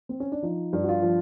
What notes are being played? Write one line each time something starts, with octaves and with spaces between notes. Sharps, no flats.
C4
C#4
D4
F3 D#4
G2
F#4
F4
F3